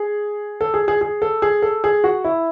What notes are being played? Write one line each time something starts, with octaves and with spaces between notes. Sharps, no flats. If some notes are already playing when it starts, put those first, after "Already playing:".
Already playing: G#4
A4
G#4
G#4
G#4
A4
G#4
A4
G#4
F#4
E4